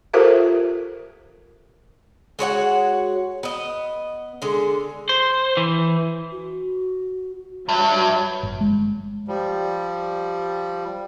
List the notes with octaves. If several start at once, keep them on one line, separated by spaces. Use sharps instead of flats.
F4 G4 A4 A#4 C5 E5
G#3 F#4 C#5 F#5
B3 D#5
D3 G#3
C5
E3
F#4
G2 F#3 E5
G1
G#3
F3 G3